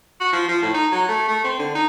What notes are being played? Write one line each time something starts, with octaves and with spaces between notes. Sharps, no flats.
F#4
F3
F3
A2
D#4
F#3
A3
A3
C4
D3
D#4